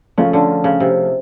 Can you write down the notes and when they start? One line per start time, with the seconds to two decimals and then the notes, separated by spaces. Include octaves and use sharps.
0.18 C#3 F3 A3 C#4 F4
0.33 D3
0.64 C#3
0.80 C3